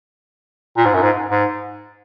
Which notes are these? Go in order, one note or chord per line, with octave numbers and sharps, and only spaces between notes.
A#2
G#2
F#2
G#2
G#2